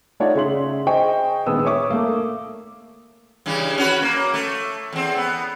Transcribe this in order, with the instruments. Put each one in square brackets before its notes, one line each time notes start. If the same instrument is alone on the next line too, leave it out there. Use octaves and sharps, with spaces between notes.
[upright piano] A3 D#4 F4 C#5 D5 F#5
C#3 E5 C6 F#7
G#4 C5 D#5 G5 C#6
A#1 D#3 G#3 B3 D#6 E6
C#5 E5 C#6 D6
A3 A#3
[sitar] G2 C#3 E3
C#4 F#4 B4
A#3
A3
E2 C4
B3